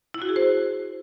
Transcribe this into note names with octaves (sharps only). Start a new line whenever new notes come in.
E4
F#4
G#4
C5